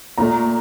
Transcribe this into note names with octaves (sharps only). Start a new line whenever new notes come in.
A#2 A3 A#5